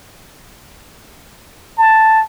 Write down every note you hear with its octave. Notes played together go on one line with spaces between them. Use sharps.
A5